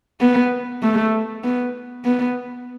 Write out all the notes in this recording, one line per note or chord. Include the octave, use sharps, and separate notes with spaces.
B3
A3
B3
B3